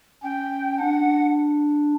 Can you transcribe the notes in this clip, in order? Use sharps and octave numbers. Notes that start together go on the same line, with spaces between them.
C#4 G5
D4 F#5